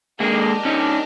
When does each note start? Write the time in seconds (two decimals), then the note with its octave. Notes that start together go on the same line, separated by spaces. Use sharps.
0.20 G#3 A#3 D4 G4 A#4 D#5
0.65 C#4 D#4